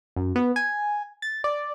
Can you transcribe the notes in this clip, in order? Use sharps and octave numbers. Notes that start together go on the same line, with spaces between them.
F#2
B3
G#5
A6
D5